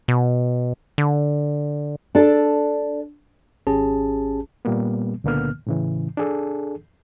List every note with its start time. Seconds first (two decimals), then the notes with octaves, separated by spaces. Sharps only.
0.08 B2
0.98 D3
2.15 D4 A4
3.67 G#1 C#4 G4 G#4 A5
4.65 A#2 G3 A#3 B3
5.24 C#2 A#2 D3 A#3 B3 F6
5.67 A2 C#3 E3
6.17 D4 G#4 A4